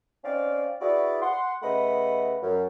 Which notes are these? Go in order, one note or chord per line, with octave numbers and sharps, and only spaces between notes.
C4 C#4 D#4 D5 F5
E4 F#4 G#4 B4 D5
F#5 C6
C#3 A3 B4 D#5 F#5 B5
F#2